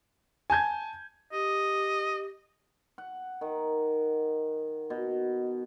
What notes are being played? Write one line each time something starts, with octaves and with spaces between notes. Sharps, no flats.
G#5 A5 G6 G#6
G4 D#5
F#5
D#3
B2